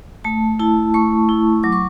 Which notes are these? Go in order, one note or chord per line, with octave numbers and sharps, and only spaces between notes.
A3 A5
E4 A5
A3 C#6
E4
F#3 D6
C#6